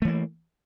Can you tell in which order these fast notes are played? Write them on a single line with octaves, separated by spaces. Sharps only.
A3 E3 A#3